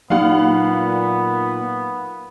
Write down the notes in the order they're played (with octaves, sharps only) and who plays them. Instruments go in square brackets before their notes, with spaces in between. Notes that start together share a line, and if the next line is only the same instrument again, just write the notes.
[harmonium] A#2 [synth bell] F#3 A#3 D#4 [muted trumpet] B3 [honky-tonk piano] F5 F#5